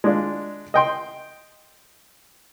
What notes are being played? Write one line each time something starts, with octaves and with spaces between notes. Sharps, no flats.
G#3 D4 F4
D#5 G5 C6